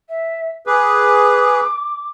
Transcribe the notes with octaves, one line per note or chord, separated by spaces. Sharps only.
E5
G#4 B4 D6